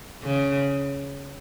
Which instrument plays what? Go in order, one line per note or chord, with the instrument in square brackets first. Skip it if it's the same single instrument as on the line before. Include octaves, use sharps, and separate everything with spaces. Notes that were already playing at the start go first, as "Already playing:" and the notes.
[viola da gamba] C#3